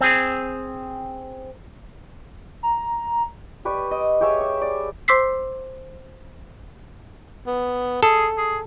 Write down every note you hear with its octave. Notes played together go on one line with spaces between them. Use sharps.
C4 G#4
A#5
G4 B4 D5 C#6
D#5
G4 G#4 C#5 E5
C#6
D5
C5 C6 D6 E6 B6 C7
B3
G#4 A4
G#4